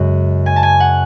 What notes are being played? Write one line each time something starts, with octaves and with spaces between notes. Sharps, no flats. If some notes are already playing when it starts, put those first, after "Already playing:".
Already playing: F#2 C#3 G#3
G#5
A5
G#5
F#5